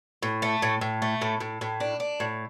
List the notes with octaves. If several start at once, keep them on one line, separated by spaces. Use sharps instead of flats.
A2
A3
A2
A2
A3
A2
A2
A2
D4
D4
A2